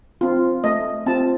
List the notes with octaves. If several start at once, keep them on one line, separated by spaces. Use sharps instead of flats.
C4 F4
A3 D#5
C4 F4 A5